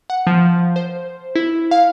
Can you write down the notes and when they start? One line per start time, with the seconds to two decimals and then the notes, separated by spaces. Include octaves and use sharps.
0.10 F#5
0.27 F3
0.76 C5
1.36 E4
1.71 F5